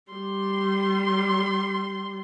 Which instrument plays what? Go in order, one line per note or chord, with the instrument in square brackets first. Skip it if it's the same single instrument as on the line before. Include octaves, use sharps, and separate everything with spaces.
[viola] G3 C6